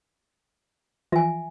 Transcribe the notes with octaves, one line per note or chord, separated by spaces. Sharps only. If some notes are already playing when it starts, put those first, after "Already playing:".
E3 F3 F4 E5 G#5